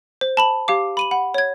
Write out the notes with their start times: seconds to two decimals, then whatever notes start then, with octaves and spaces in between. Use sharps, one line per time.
0.21 C5
0.37 A5 B5 F#7
0.68 G4 F5 D6
0.97 B5 D#7 F#7
1.11 F#5 B5
1.34 C#5 G#6